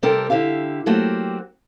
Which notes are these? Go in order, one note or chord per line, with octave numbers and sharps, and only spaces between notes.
C3 G3 C4 G4 A4 A#4
D3 E4 G4 F5
F#3 A3 A#3 C4 F#4 G4